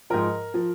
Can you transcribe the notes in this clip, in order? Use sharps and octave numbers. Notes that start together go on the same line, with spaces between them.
G#2 F3 A#4
F3